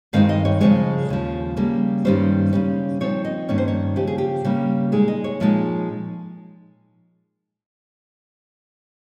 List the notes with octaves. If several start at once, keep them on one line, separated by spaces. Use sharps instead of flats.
G2 D#3 G#3 C4 D#4 F5
D#5
C#5
C#3 F3 G#3 C#5
D#2 C#3 F3
C#3 G3 A#3
G2 D#3 G3 C#4 C5
C#3 G3 C#4
A#2 F3 C4 D#4 C#5
D#5
G2 D#3 A#3 C#4 C#5
C5
C#5
C#3 F3 C4 G4
G#4
G4
C#3 G3 A#3
A#2 G#3 D#4 G#4
D#5
C#5
A#2 F3 G#3 D#4